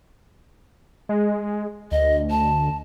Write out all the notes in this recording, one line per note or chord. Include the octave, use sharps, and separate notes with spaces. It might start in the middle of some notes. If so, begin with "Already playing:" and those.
G#3
D2 D#5
A5